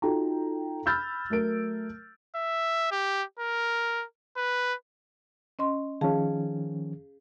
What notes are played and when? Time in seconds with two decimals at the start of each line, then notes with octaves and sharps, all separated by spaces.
0.02 D#4 F4 F#4 A4 G5 A#5
0.86 B5 E6 F6 G6 A6
1.30 F#3 A3 A#4 D7
2.35 E5
2.91 G4
3.39 A#4
4.37 B4
5.59 C#4 D#5 C6
6.01 D#3 F3 C#4 G#4 F5 A5